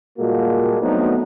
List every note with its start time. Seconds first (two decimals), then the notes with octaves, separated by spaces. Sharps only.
0.18 A#2 G3 G#3 A#3 F#4 A4
0.81 F#3 A3 B3 C4 D4 D#4